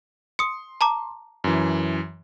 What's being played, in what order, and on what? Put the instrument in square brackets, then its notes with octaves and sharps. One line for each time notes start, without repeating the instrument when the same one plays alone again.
[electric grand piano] C6 [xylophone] D#6 C#7
[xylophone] A5 A#5 D6
[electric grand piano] F#2 E3